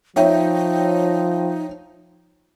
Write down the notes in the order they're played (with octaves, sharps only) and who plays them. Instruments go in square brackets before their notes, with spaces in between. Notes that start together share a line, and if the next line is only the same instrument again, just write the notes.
[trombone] F3 [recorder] D#4 [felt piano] C#5 E5 G5